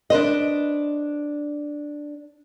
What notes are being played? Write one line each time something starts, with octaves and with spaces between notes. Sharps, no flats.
D4 B4 C5 D#5